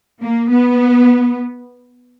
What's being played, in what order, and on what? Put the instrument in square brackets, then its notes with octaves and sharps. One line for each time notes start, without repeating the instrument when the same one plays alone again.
[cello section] A#3
B3